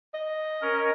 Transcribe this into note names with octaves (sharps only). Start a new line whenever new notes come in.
D#5
C#4 A#4